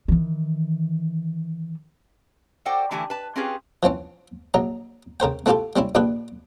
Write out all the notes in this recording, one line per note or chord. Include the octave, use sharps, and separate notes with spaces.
D#3 E3
F#4 A4 C5 D5 F#5 G5
D3 E3 A3 E4 G4 G#5
B4 A5
C4 C#4 F4 G4 G#4 B4
E3 F3 C4 C#4
A#1 F#3 A#5
C#3 A#4 C5 G5
A3 C4 E4 F4 G4 A4
G3 C4 C#4 E4
A#1 A#2 D4 G4 B4